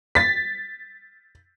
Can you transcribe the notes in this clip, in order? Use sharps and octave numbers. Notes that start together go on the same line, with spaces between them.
A6 B6